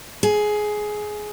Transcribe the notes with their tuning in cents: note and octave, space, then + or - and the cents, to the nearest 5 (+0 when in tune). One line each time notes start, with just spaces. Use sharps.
G#4 +15